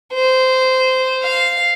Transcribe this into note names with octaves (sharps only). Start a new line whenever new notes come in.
C5
F5